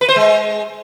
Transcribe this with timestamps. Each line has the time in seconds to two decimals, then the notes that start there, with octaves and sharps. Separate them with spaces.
0.01 B4
0.08 C5
0.16 G#3